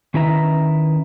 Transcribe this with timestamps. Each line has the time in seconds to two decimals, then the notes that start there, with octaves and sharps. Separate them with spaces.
0.14 D#3 C#4 E4 B4 E5 A#5